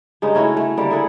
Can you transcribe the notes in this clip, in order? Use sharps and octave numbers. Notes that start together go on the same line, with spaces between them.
G2 C#3 G#3 D#4
A3 C#4 E4 F#4
A3
D3 G3 A#3
E4 G#4 A4 F#5